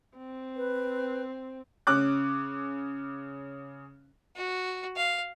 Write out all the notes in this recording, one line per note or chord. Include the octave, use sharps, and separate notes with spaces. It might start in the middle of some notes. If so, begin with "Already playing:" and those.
C4
B4
C#3 C#4 D6 F#6
F#4
F5